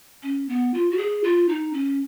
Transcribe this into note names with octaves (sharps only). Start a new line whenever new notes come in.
C#4
B3
F4
F#4
G#4
F4
D#4
C#4